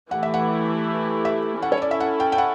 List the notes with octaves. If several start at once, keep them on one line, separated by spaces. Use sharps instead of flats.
E3 A3 E4 G4 F#5
E5
F#5
E5
C#4 E4 A4 F#5
C#5
D5
E5
F#5
G5
G5
F#5